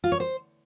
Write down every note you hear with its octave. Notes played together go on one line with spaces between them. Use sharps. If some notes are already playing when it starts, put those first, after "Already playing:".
F4
C#5
C5